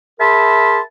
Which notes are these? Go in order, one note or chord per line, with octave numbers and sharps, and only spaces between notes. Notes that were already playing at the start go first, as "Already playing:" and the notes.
G#4 A#4 E5 A5 B5 C6